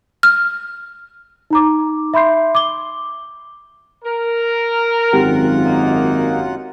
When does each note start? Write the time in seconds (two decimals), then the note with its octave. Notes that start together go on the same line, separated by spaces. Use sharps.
0.23 F6
1.50 D#4 A#5 D6
2.14 E5 B5 C6 G6 C7
2.55 D6 G7
4.04 A#4
5.13 G#1 F#2 F4 G4 F#5
5.65 A#3 D#4